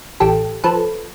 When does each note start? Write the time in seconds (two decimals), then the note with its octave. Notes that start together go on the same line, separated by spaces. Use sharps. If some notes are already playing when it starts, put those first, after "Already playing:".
0.20 A1 G4 A4
0.64 F3 A4 B4